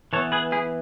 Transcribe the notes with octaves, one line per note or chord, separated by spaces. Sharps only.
E3 B3 A4 C#5
G#4 B4
E4 G#4